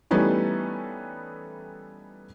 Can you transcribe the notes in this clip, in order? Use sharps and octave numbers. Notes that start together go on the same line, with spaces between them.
E3 G3 A3 B3 C#4 D#4